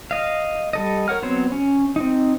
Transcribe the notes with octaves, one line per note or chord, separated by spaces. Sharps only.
D#5 F5
G3 A4 D#5
A#4 C#5 F#5 F6
F#3 B3 C4 C5 C#5
C#4
C4 D#4